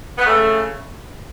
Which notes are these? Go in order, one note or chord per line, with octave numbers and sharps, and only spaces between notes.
B3
C#3 A3